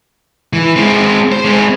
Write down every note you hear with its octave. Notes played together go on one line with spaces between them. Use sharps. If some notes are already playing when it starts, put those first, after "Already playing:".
E3
G#3 C4
C5
G#3 C4